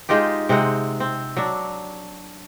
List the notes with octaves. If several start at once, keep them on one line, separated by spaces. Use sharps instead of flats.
G#3 D#4 F4 G4
C3 G#3 C4 F#5
C4
F#3 D4